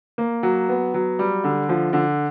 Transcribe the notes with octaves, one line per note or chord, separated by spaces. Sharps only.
A#3
F#3
B3
F#3
G3
D3
F3
D3